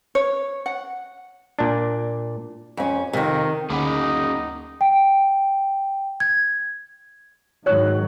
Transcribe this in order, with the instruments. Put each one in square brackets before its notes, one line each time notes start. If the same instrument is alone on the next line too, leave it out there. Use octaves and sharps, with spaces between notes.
[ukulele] C#5
F#5
[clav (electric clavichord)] A#2 D4
[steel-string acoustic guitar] F2 C#4
[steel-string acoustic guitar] F2 C3 [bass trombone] D#3
[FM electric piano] D2 [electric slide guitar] A#3 C#4 G#4 [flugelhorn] D#4 [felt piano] F#5 B5 D6
[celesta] G5
G#6
[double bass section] G#2 D#3 F#3 [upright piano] C#5 F#6